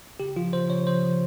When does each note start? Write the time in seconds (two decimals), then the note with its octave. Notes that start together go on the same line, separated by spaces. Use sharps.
0.20 C#3 G4
0.37 F3 F4
0.53 C#3 C5
0.70 C#3 C#5
0.87 F3 C5
1.03 F3